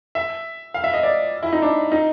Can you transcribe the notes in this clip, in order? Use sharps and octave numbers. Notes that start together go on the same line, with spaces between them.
E5
F5
E5
D#5
D5
E4
D#4
D4
D#4